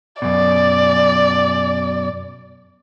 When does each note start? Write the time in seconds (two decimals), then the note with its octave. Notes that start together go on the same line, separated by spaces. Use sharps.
0.22 F#2 B2 D5